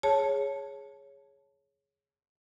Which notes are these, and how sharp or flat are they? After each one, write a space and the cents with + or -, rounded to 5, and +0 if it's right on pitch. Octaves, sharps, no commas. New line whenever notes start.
G#4 +0 C#5 +0 A5 +0